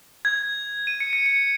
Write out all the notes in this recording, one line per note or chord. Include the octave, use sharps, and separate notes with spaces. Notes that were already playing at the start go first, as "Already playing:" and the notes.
G#6
D#7
C#7
C#7
C#7